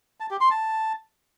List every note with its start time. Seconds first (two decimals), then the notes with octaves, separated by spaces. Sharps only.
0.20 A5
0.31 G4
0.41 C6
0.51 A5